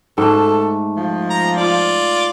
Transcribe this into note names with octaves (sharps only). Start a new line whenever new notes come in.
G#2 A3 A4
F3
A#5
F4 D5